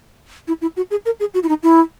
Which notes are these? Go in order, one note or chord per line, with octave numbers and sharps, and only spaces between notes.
E4
E4
F#4
G#4
A#4
G#4
F#4
E4
D#4
E4